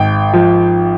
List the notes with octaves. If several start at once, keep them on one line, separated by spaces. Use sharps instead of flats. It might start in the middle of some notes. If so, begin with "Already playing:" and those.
Already playing: G#1 G5
F3